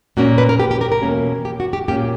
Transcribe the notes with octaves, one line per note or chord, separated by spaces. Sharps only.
A#2 A#3 C#4 F#4
B4
A#4
G4
G4
A#4
A#4
E2 B2 A#3 C#4
G4
F#4
G4
A#2 A#3 C#4 G4